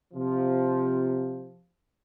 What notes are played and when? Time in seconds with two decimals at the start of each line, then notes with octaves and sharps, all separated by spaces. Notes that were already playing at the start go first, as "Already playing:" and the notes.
0.13 C3 F3